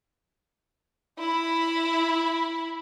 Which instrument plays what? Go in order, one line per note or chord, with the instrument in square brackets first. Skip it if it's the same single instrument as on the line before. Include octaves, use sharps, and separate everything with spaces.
[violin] E4 B5